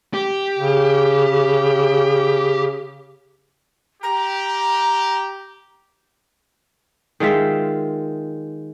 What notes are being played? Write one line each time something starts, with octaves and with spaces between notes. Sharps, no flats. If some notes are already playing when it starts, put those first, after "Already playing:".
G4
C#3
G4 A#5
D#3 G#3 F4 E5